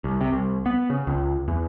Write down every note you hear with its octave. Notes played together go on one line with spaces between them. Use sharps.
C2
C3
C2
B3
C#3
C#2
E2